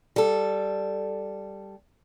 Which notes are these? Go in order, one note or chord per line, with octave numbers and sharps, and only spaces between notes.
G3 A4